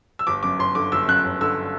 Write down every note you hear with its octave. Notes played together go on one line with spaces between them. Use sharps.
E6
G1 D6
F#2 D6
G1 C6
D3 D6
G1 E6
F#2 F#6
G1
D3 E6